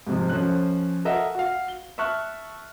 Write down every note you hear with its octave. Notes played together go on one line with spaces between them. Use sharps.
G#2 C3 F3
F3 C#4 A4 F#6
A4 A#4 D#5 E5 F#5
F#4 F5
G7
E5 A5 C#6 F6 F#6